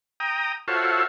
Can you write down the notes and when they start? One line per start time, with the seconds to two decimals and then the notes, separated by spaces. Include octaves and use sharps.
0.20 G5 A#5 D#6
0.68 F4 F#4 A4 C5 C#5 E5